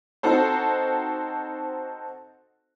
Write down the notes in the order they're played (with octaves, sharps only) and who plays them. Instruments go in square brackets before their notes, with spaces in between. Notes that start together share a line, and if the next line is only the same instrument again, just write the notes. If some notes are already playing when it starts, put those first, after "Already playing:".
[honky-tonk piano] C4 D#4 F#4 A4 C5